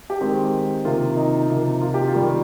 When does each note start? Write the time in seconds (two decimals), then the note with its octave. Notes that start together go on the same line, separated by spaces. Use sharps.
0.10 G4
0.21 D#3 G#3 C4
0.85 C3 D#3 A#3 F4
1.16 D#4
1.49 C3 F3 A#3
1.82 F4
1.94 G4
2.08 F4
2.14 D#3 G3 A#3